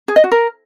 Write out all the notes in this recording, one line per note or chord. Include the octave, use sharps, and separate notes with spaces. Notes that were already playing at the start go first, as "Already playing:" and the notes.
G#4
D#5
F#4
A#4